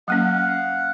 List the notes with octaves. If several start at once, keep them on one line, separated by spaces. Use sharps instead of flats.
F#3 A#3 C#4 F5 F#5